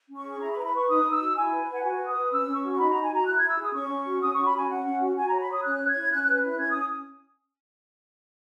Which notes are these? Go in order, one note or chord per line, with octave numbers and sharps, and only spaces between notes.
C#4
C#6
G#4
E4 A#5
B5
B4 A#5
B5
B4 C#6
D#4 D#6
D#4
E6
F#4
E4 G#5
B4
B4
F#5
F#4 G#5
B4
D#6
B4
C#4 E6
C#4
C#6
F#4
C#6
D#4 B5
D#4 A#5
G#5
F#4 A#5
E4 F#6
E4 G#6
E6
G#4 D#6
C#4 C#6
C#4
F#4
C#4 D#6
C#4 C#6
B5
F#4 G#5
C#4 F#5
C#4
F#4
F#4 G#5
C#5 A#5
B5
C#5 D#6
C#4 F#6
C#5
G#6
E4
C#4 F#6
B4 F#6
E4 F#6
C#4 G#6
C#4 D#6